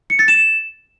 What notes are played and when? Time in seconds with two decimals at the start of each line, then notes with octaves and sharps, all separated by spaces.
0.10 C#7
0.19 A6
0.28 E7